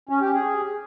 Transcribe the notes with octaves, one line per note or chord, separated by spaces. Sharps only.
C#4
G4
G#4